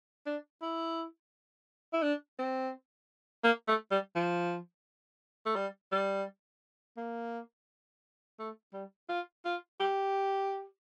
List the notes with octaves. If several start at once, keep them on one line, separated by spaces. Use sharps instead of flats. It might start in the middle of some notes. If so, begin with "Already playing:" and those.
D4
E4
E4
D4
C4
A#3
A3
G3
F3
A3
G3
G3
A#3
A3
G3
F4
F4
G4